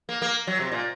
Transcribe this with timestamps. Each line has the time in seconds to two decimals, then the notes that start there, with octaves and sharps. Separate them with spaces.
0.09 A#3
0.22 A#3
0.47 F#3
0.60 C3
0.72 A#2